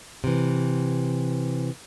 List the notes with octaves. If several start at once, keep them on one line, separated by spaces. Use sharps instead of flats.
C3 E3